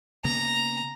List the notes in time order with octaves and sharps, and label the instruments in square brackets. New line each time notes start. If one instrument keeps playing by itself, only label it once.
[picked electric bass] C#3 A#3 B3 [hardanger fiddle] A#5